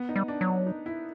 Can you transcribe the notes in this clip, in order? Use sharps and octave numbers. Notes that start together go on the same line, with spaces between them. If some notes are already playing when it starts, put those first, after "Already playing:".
Already playing: B3
D#4
G3
D4
F#3
D4
D#4
E4